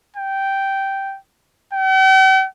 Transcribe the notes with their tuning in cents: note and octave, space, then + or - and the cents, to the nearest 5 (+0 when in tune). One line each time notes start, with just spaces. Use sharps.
G5 -10
G5 -45